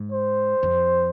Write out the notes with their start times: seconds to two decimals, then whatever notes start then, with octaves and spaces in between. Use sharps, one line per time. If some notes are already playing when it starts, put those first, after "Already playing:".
Already playing: G#2
0.12 C5
0.63 F2